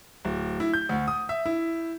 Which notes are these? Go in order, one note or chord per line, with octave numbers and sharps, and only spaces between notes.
D1
E4
G6
D2
D#6
E5
E4